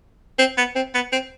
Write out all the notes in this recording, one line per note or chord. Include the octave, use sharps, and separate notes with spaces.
C4
B3
C4
B3
C4